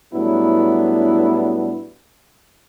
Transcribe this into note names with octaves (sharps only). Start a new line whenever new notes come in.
A2 F#3 G3 B3 D4 E4